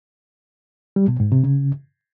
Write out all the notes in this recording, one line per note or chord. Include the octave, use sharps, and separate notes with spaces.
G3
B2
G#2
C3
C#3